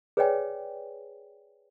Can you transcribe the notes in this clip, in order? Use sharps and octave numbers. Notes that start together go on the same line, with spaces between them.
G#4 B4 C#5 D5 G5 G#5